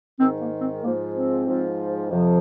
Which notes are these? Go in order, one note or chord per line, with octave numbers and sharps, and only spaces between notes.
G#2 D#3 C4
A#3
C4
G#2 F3 A#3
C4
G#2 F3
F2 C3 F3